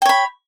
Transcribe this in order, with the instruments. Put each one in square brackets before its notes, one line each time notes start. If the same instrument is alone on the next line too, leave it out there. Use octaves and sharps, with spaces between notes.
[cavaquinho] G5
C#5
B5